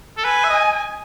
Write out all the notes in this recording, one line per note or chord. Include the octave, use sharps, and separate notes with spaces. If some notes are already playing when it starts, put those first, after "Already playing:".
A4
B4 G#5
E5
D#5